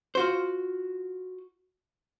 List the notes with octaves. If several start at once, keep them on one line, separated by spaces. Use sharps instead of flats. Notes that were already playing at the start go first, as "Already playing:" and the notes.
F4 F#4 C5